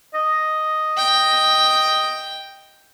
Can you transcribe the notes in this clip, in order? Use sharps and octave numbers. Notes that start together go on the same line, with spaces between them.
D#5
G5